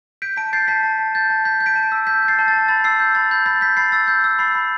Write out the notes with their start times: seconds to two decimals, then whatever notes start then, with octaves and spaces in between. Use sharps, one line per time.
0.22 G6 B6 D7
0.36 A5 B6 D7
0.53 G6 A6 C7
0.68 A5 G6 B6
0.83 A5
0.99 A5
1.15 G6 A6
1.30 A5
1.45 G6 B6
1.61 G6
1.66 B6 D7
1.76 A5
1.92 E6
2.07 G6 B6
2.22 G6
2.28 A6 C7
2.39 A5 G6
2.48 A6
2.53 A5
2.68 B5 A6
2.84 E6 A6 C7
3.00 G6
3.15 B5 A6
3.31 B5 G6
3.46 B5 A6
3.61 G6 B6
3.77 B5 A6 C7
3.92 E6 A6
4.08 G6
4.24 E6 A6
4.39 B5 A6 C7
4.55 B5